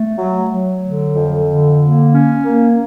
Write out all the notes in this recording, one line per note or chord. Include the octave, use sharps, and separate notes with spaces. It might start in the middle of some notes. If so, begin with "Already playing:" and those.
Already playing: A3
F#3
F#3
D3
F2
D3
A#3
C#4
A#3